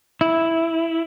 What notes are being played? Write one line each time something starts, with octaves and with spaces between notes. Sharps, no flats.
E4